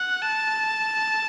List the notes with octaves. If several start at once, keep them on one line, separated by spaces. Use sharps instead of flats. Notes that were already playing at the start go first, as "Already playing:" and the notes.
Already playing: F#5
A5